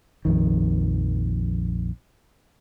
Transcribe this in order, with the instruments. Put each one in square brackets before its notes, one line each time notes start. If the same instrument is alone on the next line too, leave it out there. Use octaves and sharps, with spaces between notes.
[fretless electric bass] A#1 F2 D#3